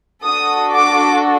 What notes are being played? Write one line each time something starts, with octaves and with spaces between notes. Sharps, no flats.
D4 F#4 A4 D#6
D6